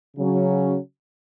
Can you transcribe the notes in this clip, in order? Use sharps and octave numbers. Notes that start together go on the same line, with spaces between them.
C#3 F#3 C#4